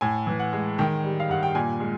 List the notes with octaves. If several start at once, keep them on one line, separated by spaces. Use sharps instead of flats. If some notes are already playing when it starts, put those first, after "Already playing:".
A2 G#5
E3
F#5
G#3
D#3 G5
G3
F5
G2 F#5
G5
A#2 G#5
G#3